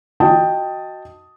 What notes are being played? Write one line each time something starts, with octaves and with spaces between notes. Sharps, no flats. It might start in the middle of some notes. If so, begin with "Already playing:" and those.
F#4 D#5 G5 A5 D#6